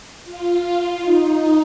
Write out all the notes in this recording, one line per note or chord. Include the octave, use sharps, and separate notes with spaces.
F4
D#4